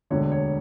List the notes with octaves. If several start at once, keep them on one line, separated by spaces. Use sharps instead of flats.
E1 D2 D3 C#5
C#5